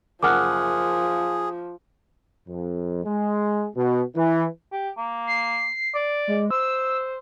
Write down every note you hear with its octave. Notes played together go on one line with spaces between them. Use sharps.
F#1 F3 G#4 F#5 D6 F6 F#6
F2
G#3
B2
E3
G4
A#3
C7
D5
G#3
C5 E6